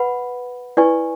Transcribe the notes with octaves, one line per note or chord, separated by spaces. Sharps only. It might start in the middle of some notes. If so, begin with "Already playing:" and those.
Already playing: B4 F#5 B5
E4 B4 D5 G#5 C#6